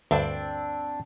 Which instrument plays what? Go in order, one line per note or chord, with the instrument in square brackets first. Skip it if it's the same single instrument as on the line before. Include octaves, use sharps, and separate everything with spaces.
[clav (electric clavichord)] D2 G2 [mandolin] C4 D4 E6